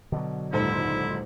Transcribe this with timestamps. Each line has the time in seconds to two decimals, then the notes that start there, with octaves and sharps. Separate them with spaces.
0.12 B2 D3 F#3
0.53 D#1 C#2 G#2 E4 A4 C5